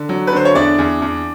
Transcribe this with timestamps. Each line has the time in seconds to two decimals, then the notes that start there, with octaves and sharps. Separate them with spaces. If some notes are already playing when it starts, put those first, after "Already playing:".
Already playing: D3
0.09 F#3
0.27 B4
0.33 D3 C5
0.45 C#5
0.55 E2 D4 D5
0.78 E2
1.02 E2